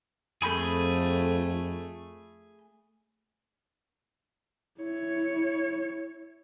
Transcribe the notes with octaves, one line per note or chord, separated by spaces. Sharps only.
F2 A3 G#4 B5 G6
E4 C#5